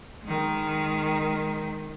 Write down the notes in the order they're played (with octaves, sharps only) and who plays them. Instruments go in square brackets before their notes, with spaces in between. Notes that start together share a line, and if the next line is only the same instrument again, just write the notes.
[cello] D#3 G#3